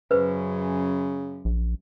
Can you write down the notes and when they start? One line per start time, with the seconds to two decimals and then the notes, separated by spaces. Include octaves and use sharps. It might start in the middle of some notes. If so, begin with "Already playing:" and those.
0.11 F#2 C#3 B4 C5
1.45 A#1